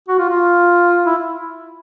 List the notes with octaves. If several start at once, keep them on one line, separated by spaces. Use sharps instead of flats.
F#4
F4
F4
E4